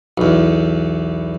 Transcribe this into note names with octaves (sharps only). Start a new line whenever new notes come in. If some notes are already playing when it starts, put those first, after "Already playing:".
B1 E2